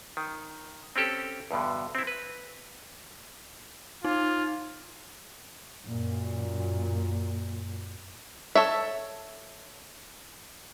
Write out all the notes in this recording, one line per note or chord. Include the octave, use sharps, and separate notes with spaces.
D#3
C4 C#4 G4 A4
E2 G2 B2 D3
C4 E4
B4
D#4 F4
F#2 A#2
A4 C#5 E5